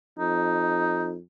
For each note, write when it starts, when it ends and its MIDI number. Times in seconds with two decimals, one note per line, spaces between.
0.19 1.19 41
0.19 1.15 63